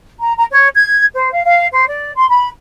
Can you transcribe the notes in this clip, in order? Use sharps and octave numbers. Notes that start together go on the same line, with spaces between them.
A#5
A#5
C#5
G#6
C5
F5
F5
C5
D5
C6
B5